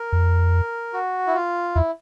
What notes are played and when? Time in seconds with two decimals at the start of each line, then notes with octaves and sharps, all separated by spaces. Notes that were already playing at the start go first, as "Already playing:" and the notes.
Already playing: A#4
0.12 F2
0.93 F#4
1.27 E4
1.35 F4
1.75 E2 E4